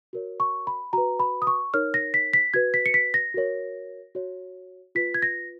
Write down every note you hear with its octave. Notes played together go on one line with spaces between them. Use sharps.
F#4 A#4 C#5
C#6
B5
F#4 B4 A#5
B5
D#6
C#6
D#4 A#4 C#5 F6
A#6
B6
B6
F#4 B4 G#6
B6
C#7
B6
A#6
F#4 A#4 C#5
F#4 C#5
F4 B4 B6
G#6
A#6